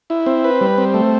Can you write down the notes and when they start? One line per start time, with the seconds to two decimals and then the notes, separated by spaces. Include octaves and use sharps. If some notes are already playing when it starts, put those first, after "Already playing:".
0.10 E4
0.26 C4
0.44 B4
0.61 G3
0.78 C4
0.94 A3